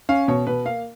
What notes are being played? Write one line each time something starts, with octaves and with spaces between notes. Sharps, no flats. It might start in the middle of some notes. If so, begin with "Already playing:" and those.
C#4 F5
B2 C#5
B2 B4
A#3 F5